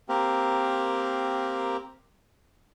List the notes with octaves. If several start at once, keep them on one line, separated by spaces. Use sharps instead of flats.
A#3 C4 G4 A#4